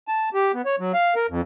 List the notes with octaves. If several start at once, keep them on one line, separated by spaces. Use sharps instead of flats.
A5
G4
B3
C#5
F#3
F5
A#4
F2